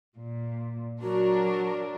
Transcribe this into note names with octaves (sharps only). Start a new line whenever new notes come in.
A#2
F#3 D4 F#4 A#4